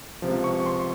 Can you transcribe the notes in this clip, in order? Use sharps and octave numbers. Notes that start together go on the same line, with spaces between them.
C#2 C3 F3
C#6
C6